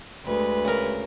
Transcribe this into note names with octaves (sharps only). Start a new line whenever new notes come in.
D2 G#3 B4
C#3 A#4